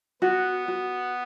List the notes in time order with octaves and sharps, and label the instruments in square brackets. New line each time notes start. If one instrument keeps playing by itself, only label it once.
[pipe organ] B3 [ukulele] F#4
[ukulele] F#4